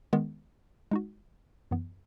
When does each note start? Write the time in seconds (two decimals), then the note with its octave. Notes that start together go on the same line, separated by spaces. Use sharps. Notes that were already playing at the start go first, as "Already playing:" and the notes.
0.13 D#3 G#3 B3
0.91 G#3 D#4 F#4
1.71 F#2 E3 B3